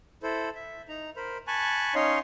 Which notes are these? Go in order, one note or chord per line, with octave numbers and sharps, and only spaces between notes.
E4 A4 C5
E5
D#4 A#5
A#4 C5 B5
G#5 A5 B5 C#6 F#6
C#4 D#4 C#5 D#5 F5 C6